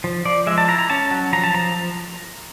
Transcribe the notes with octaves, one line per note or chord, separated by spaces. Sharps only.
F3
F3 D5
G#3 E5
A5
E4 A#5
A#5
C#4 A5
F#3
F3 A#5
A5
F3 A#5